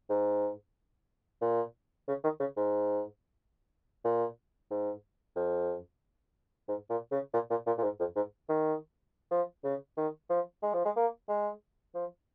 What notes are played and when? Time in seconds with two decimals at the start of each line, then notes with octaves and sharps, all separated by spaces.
0.10 G#2
1.41 A#2
2.08 C#3
2.24 D#3
2.40 C#3
2.57 G#2
4.05 A#2
4.71 G#2
5.36 F2
6.68 G#2
6.90 A#2
7.12 C#3
7.33 A#2
7.50 A#2
7.67 A#2
7.78 A#2
7.83 G#2
8.00 F2
8.16 G#2
8.49 D#3
9.31 F3
9.64 C#3
9.97 D#3
10.30 F3
10.63 G#3
10.74 F3
10.85 G#3
10.96 A#3
11.29 G#3
11.95 F3